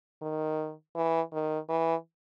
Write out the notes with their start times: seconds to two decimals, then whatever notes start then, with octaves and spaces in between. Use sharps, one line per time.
0.22 D#3
0.95 E3
1.33 D#3
1.69 E3